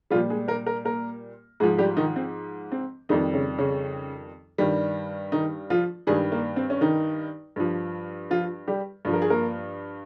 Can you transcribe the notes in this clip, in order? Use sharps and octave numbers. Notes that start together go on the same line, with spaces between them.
A#2 F3 G3 F4
G#3 G#4
A#3 A#4
A#4
A#3 A#4
G#2 F3 G#3 G#4
G3 G4
D#3 D#4
C4
C4
F2 D#3 G3 D#4
C#3 C#4
C#3 C#4
G2 D#3 G3
D#3 D#4
F3 F4
G2 D#3 G3 G#3 G#4
A#3
C4
C#4
D#3 D#4
G2 F3
F3 F4
G3 G4
G2 F3
A#4
G#4
A#3 A#4